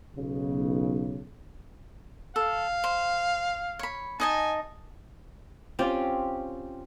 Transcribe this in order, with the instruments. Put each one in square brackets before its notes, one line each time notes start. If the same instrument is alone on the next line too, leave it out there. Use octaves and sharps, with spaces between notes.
[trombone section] B1 C#3
[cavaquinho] A4 [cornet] F5
[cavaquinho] C5
C#5 B5
[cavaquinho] D#4 D#5 A5 [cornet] G#5
[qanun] C4 C#4 F4 G4